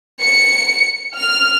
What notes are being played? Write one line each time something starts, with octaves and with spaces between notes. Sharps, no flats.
C#7
F6